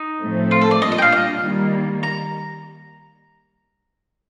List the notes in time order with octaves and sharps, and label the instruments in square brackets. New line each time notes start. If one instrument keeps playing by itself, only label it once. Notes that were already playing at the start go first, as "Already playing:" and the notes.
Already playing: [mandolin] D#4
[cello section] A2 F3 A3 C4
[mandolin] F4
A4
D5
[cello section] A#2 G3 D4 F4 [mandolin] D#5
[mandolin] D#5
G5
F5
D#5
[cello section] D#3 G3 A#3
[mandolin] A#5